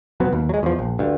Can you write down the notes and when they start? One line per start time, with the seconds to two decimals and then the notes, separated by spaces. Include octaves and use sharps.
0.20 F1 F#3 B3 C4
0.33 D#2
0.49 F#3 G#3
0.63 E2 F3
0.79 A#1
0.99 D2 G2